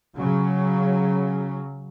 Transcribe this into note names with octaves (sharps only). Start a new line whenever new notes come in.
C#3 F#3